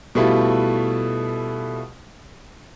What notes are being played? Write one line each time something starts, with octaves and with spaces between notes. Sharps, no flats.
B2 G3 A3 E4 F4